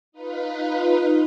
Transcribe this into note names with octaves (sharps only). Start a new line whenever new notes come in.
D#4 F4 B4